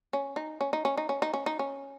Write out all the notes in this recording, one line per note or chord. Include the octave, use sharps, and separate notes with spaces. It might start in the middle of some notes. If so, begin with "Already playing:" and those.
C#4
D#4
C#4
D#4
C#4
D#4
C#4
D#4
C#4
D#4
C#4